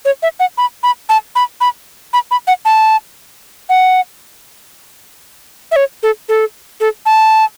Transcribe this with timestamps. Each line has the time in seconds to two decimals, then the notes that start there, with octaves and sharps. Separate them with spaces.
0.05 C#5
0.22 E5
0.40 F#5
0.58 B5
0.83 B5
1.09 A5
1.35 B5
1.61 B5
2.13 B5
2.31 B5
2.47 F#5
2.65 A5
3.69 F#5
5.71 E5
5.76 C#5
6.03 A4
6.29 A4
6.80 A4
7.06 A5